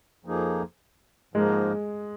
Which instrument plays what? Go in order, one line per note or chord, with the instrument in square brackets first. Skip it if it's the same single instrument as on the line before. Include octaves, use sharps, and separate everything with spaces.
[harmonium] F2 F3 A#3 D#4 G#4
[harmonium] G#2 F3 A#3 D#4 A#4 [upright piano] G#3